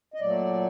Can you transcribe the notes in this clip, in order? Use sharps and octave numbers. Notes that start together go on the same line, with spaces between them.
D#5
A#2 F#3 A3 D5